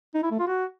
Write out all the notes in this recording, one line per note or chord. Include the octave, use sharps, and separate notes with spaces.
D#4
E4
A3
F4
F#4